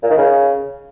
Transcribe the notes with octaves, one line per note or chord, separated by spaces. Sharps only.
A#2
D#3
C#3